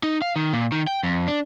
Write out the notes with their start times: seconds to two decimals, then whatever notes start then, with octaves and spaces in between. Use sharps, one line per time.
0.03 D#4
0.22 F5
0.36 D#3
0.53 A#2
0.72 D#3
0.87 G5
1.03 F2
1.28 D4